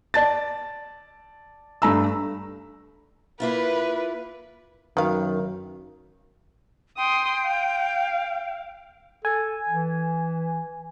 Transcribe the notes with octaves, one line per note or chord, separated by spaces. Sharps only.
D5 A5 A6
G2 A3 A#5 B5 E6
A#3 E4 F4 B4
F#2 D#3 A#4 B4 F5
G5 C6 D#6
F5
A4 G#5
E3